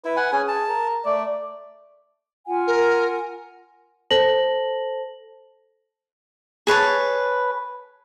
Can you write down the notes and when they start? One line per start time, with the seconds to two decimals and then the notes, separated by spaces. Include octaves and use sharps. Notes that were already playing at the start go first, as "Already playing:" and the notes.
0.05 E4 B4
0.17 F#5 G#5
0.32 C#4 G#4 G#5
0.48 A5
0.69 A#4
1.05 A3 D5
2.47 F4 F#5 G#5
2.67 A#4
4.11 A4 C5 A5 A#6 F#7
6.67 G#4 B4 C#5 A5